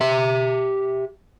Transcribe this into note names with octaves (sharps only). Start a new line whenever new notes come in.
G4 E5